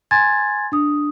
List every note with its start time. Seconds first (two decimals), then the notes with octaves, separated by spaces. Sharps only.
0.11 G#5 C6 G#6 A6
0.72 D4 D#6